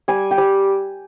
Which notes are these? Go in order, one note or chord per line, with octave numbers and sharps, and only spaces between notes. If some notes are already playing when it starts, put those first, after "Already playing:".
G3 G#5
G5
G3